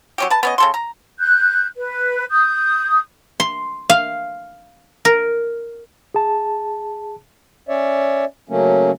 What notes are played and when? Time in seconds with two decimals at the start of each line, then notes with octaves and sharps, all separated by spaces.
0.18 F#3 C#4 G4
0.30 B4 A5
0.43 B3 C#4 D#5
0.58 C#3 A4 C6
0.74 A#5
1.19 F#6 G6
1.76 B4
2.30 D#6 G6
3.40 C6
3.90 F5
5.05 A#4
6.14 G#4 A5
7.69 C#4 C#5 D5 E5
8.49 C#3 F#3 A3 A#3 C#4